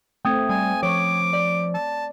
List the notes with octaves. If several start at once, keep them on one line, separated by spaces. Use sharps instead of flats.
A3 C4 G5 D#6 G#6
G3 G#5
F3 C#5 D6
D5
A5